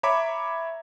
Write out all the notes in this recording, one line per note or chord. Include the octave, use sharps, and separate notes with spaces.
C#5 E5 A#5 B5 D6